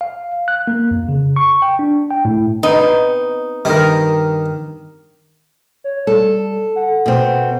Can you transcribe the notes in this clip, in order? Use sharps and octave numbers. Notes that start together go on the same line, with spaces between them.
F5
F#6
A#3
F2
C#3
C#6
G5
D4
G5
A2
B3 C4 D#4
G2 D#3 G4 A#4
C#5
G3 A4
F#5
B2 C4